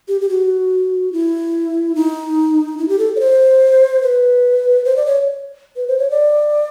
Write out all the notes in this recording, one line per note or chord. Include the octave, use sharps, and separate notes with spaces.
G4
G4
F#4
E4
D#4
E4
G4
A4
C#5
C5
B4
C5
D5
C#5
B4
C5
C#5
D5